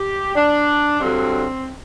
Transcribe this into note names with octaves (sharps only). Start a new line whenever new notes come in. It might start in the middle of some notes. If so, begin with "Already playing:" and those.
Already playing: G4
D4
G2 D3 F#3 C4